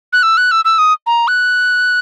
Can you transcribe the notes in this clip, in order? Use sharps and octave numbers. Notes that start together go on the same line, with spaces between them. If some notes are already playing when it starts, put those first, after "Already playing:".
F#6
E6
F#6
E6
E6
D#6
A#5
F#6